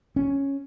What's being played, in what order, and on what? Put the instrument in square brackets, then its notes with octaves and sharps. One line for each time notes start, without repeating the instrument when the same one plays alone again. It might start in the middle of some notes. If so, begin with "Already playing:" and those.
[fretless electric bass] C#4